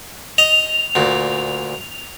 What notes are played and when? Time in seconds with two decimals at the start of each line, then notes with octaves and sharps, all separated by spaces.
0.38 D#5 F7
0.95 D2 A#2